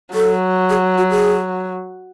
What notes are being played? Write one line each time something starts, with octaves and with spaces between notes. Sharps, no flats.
F#3 A4
G#4
F#4
G#4